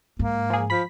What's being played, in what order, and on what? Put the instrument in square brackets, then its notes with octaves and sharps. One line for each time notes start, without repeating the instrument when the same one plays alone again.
[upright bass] G#2 [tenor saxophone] A#3
[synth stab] F3 G#4
[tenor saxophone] F3 [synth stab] B5 B6